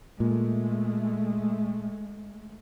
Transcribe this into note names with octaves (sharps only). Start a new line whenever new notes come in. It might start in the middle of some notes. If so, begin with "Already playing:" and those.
A#2 G#3 A3